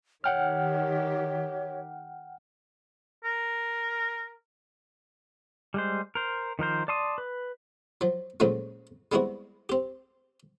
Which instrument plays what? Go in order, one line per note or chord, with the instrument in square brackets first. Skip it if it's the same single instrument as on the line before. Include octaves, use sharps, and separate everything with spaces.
[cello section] D#3 G4 [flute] C#5 [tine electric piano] F#5 G5 F6
[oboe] A#4
[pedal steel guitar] G3 G#3 C5
A#4 C5
D#3 F3 A#4 C5
D5 A5 C6 D#6
B4
[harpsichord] F3 F#3
A#2 C#3 F3 F#3 G#3 A3
G3 G#3 B3 C4 E4 F#4
C4 G4